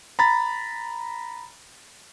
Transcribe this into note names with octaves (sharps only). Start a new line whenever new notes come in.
A#5 B5 A6